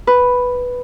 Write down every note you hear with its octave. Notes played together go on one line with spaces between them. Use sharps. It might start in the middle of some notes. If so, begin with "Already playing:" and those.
B4